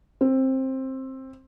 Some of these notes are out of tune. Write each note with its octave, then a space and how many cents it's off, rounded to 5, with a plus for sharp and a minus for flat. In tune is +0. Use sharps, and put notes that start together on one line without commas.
C4 +15